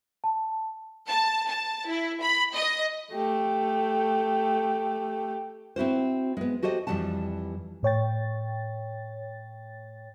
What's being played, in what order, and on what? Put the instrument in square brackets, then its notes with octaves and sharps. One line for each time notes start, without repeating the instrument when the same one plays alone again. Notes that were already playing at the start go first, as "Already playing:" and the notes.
[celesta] A5
[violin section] A5
A5
E4
B5
D#5
[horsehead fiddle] A3 G4
[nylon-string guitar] C4 E4 F#4 C5
G#3 B3
F#4 G4 A4 C5 D#5
F2 E3 F#3 G3 F#5 A5
[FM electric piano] A2 C#5 G5 A6